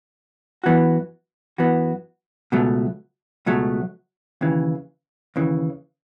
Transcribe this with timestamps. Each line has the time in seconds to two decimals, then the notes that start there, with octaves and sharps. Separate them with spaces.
0.64 F#2 E3 B3 F#4
1.58 F#2 E3 B3 F#4
2.52 C#2 B2 F#3 A3
3.46 C#2 B2 F#3 A3
4.41 D#2 C#3 E3
5.36 D#2 C#3 E3